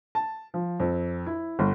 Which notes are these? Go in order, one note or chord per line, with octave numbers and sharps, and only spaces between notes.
A5
F3
F2
E4
G1